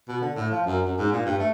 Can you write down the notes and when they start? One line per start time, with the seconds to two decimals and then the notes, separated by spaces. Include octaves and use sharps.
0.08 B2
0.21 D3
0.36 A2
0.51 F3
0.66 F#2
0.85 F#2
0.98 G#2
1.12 A#2
1.26 G2
1.39 A3